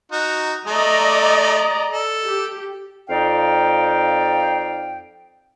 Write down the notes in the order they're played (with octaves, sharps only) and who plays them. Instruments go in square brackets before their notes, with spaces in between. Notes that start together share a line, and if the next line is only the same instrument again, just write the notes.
[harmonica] D#4 F#4
[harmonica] A3 [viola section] D5 D#5 A#5
[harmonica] A4
[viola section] G4
[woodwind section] F2 D#4 D5 F5 G5